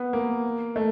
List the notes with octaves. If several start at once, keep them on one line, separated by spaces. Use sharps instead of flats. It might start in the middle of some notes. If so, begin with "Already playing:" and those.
Already playing: B3
A#3
A3